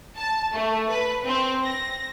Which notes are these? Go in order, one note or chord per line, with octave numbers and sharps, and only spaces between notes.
A5
A3
B4
C4
A#6